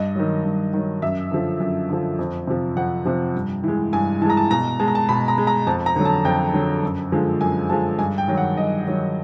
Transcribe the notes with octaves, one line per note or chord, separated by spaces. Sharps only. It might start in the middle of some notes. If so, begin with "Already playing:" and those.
Already playing: G2 D#5
D#3 F#3
G2
D#3 F#3
F#2 E5
D3 F3
F#2
D3 F3
F2
C3 F3
F2 F#5
C3 F3
G2
E3 G#3
G2 G#5
E3 G#3 A5 A#5
A5
B2 A#5
G#3 A5
A#5
A5
B2 B5
A#5
G#3
A#5
F2 A5
A#5
D3 F#3
A5
F2 G5
D3 F#3
F#2
D3 F3 G#3
F#2 G#5
D3 F3 G#3 A5
G2 G#5
G5
D#3 F#3
F#5
G2 D#5
D#3 F#3